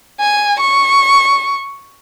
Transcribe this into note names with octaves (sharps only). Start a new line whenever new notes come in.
G#5
C#6